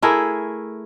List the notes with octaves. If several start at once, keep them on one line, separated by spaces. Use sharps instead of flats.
A3 E4 G#4 A#4